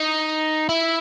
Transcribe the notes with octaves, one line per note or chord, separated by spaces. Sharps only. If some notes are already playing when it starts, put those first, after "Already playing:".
Already playing: D#4
E4